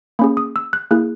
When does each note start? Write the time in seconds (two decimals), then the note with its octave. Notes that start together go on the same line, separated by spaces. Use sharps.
0.19 A#3 C#4 G#4 B5
0.37 D#6
0.56 E6
0.73 F#6
0.91 A#3 E4 G#4 F#6